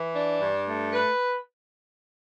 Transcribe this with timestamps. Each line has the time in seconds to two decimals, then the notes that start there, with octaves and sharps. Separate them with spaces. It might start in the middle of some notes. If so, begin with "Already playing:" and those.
Already playing: E3
0.16 D4
0.40 G2
0.67 A3
0.93 B4